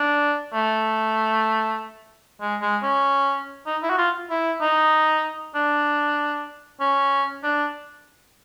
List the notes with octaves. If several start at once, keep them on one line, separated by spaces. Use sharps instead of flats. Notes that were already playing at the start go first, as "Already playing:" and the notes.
Already playing: D4
A3
G#3
G#3
C#4
D#4
E4
F#4
F4
E4
D#4
D4
C#4
D4